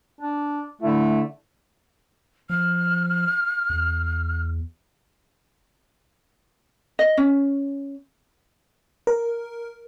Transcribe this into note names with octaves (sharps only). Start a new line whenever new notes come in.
D4
D3 A3 E4
F3 F6
E2
D#5
C#4
A#4